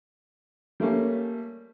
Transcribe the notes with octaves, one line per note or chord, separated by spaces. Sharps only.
G3 A3 A#3 C#4